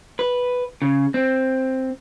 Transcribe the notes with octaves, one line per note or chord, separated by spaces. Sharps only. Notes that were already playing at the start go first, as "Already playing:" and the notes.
B4
C#3
C4